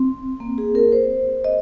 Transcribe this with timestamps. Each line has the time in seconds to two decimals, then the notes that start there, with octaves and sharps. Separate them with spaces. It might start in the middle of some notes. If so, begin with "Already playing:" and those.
Already playing: C4
0.40 A#3
0.58 G#4
0.75 A#4
0.92 C5
1.44 D#5